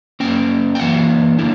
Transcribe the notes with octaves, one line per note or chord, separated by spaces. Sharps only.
F#2 E3 A#3 C#4 G5
G5
F#2 E3 A#3 F#5
D3 A#3 E4